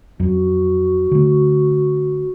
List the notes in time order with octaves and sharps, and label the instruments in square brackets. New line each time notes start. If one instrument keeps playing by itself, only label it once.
[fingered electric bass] F2 F#3 [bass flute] F#4
[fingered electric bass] D3 A3